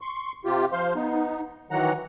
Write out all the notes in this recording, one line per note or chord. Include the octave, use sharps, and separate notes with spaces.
C6 C#6
C3 F4 G4
F3 C5 F5 C6
B3 D#4
D#3 E3 F#3 F#5 A#5